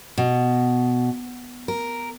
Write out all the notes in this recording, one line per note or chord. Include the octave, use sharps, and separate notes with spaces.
B2
A#4